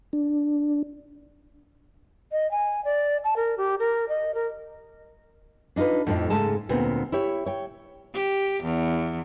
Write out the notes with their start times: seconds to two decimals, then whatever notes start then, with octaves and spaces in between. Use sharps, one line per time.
0.13 D4
2.32 D#5
2.51 G#5
2.85 D5
3.24 A5
3.36 A#4
3.58 G4
3.79 A#4
4.09 D#5
4.35 A#4
5.76 D4 D#4 F4 A4 B4
6.07 F2 A2 F3 D4 D#4
6.30 G#2 C#3 G#3 A3 A4 A5
6.69 D2 A#2 B3 C4
7.12 E4 G4 C#5
7.46 C#5 G5
8.14 G4
8.63 E2